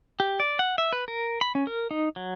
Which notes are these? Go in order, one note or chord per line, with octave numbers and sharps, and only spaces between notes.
G4
D5
F#5
E5
B4
A#4
B5
C#4
A#4
D#4
F#3